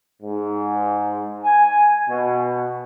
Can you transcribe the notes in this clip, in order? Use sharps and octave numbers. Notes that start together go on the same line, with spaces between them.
G#2
G#5
B2